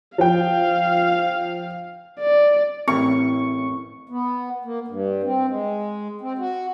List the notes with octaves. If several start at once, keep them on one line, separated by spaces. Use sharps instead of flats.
F3 F5 G5
D5
A1 C4 E4 A#4 C#6
B3
A#3
G2
C4
G#3
C4
F#4